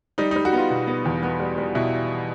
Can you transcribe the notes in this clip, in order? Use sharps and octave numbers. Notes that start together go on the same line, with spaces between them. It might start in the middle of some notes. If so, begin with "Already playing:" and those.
G3 D#4
G3 D#4
F#4
B3 F4
B2
B3
E2
B3
G3
G3
B2 E4